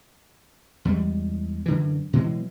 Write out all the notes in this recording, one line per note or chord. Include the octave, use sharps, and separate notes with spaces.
E2 G3 G#3
F#2 D3 E3
B2 E3 F#3 G#3